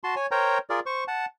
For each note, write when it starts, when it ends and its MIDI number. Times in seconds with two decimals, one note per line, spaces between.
0.04 0.15 66
0.04 0.15 81
0.04 0.15 84
0.16 0.26 73
0.16 0.26 80
0.31 0.58 70
0.31 0.58 72
0.31 0.58 73
0.31 0.58 79
0.31 0.58 82
0.70 0.80 65
0.70 0.80 68
0.70 0.80 70
0.70 0.80 74
0.86 1.04 72
0.86 1.04 85
1.08 1.26 78
1.08 1.26 81